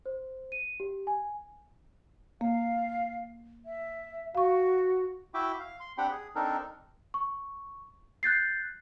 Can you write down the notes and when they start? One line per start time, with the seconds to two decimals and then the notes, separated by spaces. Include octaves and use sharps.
0.06 C5
0.52 D#7
0.80 G4
1.07 G#5
2.41 A#3 F5
3.66 E5
4.35 F#4 F5 C#6
5.34 E4 F#4 E5 G5 D6
5.59 F5
5.80 C6
5.98 C4 D4 G4 F#5 G5 B5
6.11 G#4
6.36 C4 D4 D#4 A4 A#4
7.14 C#6
8.23 F#6 G6 A6 C7